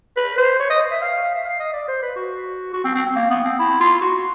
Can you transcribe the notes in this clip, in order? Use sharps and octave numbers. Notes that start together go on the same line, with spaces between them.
B4
C5
C#5
D#5
E5
F5
E5
F5
D#5
D5
C5
B4
F#4
F#4
C4
C4
C4
A#3
B3
C4
E4
F4
F#4